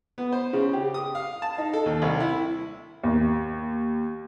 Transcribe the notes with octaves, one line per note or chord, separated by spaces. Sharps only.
B3
C5
C#3
G4
D#6
F5
A5
D#4
A4
D#2
C2
E4
D#2